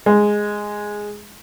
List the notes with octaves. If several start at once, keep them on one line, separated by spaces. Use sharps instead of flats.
G#3